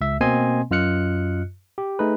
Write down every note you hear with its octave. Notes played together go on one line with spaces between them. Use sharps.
C#2 E5
B2 A#3 C4 D#5 G#5 C6
F#2 F4 D#5 F6 F#6 C#7
G4
A3 D#4 G#4 B4